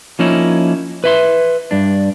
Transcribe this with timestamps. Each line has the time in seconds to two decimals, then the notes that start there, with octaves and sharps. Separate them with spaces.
0.19 F3 A#3 C#4 D#4 E4
1.04 B4 E5 C6
1.71 G2 D4